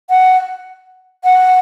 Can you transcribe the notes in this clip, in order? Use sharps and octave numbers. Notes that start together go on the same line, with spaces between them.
F#5
F#5